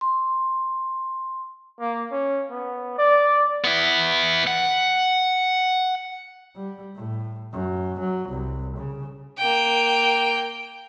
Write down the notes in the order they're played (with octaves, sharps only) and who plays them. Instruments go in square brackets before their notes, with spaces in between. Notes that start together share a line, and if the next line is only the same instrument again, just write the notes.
[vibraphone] C6
[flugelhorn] A#3
C#4
B3
D5
[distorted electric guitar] B3 E4
F#5
[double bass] G3
A2
F#2
F#3
C2
C#3
[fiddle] A#3 G5